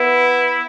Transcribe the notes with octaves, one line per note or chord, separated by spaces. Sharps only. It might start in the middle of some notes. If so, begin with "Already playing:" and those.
Already playing: B3 E4